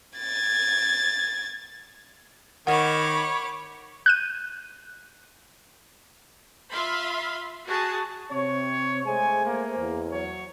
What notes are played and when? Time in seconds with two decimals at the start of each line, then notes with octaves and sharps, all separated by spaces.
0.19 G#6 A6
2.67 D#3 C#5 F#5 B5 D6
4.06 F#6 G6 D#7
6.70 F4 E5 F5 B5 C6
7.65 F#4 G#4 A5
8.30 C3 C4 C#5
9.05 G#3 A3 G#4 C5 G#5
9.46 A#3
9.77 E2
10.10 F#3 C#5